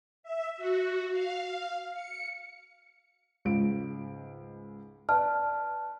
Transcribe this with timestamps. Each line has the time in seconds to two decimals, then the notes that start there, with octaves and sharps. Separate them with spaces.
0.23 E5
0.57 F#4
1.11 F5
1.93 C#7
3.45 C#2 G#2 D7
5.09 B4 D5 A5 F6